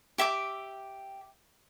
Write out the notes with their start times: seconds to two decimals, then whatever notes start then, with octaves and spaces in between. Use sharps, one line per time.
0.18 G4 E5 G5 D6